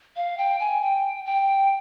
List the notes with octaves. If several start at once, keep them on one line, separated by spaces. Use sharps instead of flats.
F5
G5
G#5
G5
G5